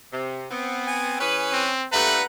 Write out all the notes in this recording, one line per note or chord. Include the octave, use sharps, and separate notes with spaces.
C3
B3 C4
G#5
E3 C#4 G#4 B4
C4
G2 A#2 A3 B4 F#5 A#5